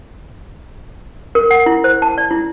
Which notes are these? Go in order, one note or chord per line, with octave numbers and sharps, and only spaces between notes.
A#4
F#5
E4
C5
A5
D5
E4